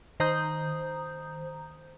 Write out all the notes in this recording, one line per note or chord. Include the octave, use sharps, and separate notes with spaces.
D#3 C5 A#5 D#6 G6